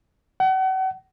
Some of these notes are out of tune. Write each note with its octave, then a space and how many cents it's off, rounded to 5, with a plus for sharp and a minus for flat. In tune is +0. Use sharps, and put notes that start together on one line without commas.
F#5 +40